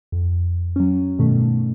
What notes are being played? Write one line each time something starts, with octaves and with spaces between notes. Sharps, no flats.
F2
F#3 C#4
G2 B2 D#3 A3